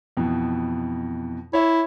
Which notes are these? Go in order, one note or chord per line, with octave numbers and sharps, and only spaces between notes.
F2 B2 E3
E4 C#5 E5